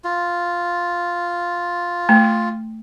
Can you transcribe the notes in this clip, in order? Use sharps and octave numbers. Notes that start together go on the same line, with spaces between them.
F4
A3